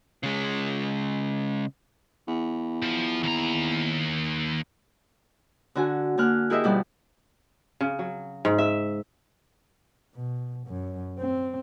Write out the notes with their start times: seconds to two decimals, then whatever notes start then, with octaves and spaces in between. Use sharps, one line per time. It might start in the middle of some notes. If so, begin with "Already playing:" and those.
0.23 C#3 G#3
2.27 E2
2.83 F3
3.23 D#2 A#5
5.75 D3 F#4 G#5
6.18 D3 A#3 G#5 F6 F#6
6.50 E4 G4 G#4 A#4 D#5 E5
6.64 D2 B2 F3 G3 B3 D5
7.81 C#3
7.99 F#3
8.45 G#2
8.58 E5
10.15 B2
10.67 F#2
11.19 C4